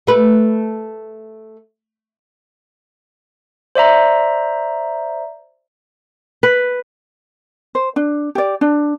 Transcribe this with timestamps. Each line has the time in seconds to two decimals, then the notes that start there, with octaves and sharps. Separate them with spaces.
0.07 A3 B4
3.75 C5 D5 E5 A#5
6.43 B4
7.75 C5
7.96 D4
8.35 G4 D5
8.61 D4